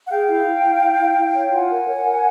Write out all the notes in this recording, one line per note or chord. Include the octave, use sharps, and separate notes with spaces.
F#5
G#4 F5 G5
E4
E4
E4
E4
E4
E4
C#5
F4 F#5 G#5
A#4
C#5
A#4